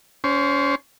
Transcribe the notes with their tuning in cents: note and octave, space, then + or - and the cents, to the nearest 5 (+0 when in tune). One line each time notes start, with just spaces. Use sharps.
C#4 +30 C5 +0